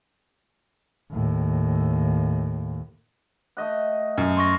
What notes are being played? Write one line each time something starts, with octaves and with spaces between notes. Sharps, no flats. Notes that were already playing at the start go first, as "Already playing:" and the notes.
D#2 A2
A3 D#5 F#5
F#2
C6 C#6 A#6